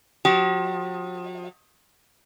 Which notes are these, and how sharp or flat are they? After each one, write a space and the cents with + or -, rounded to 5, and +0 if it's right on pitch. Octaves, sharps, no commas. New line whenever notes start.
F3 +45 G4 -45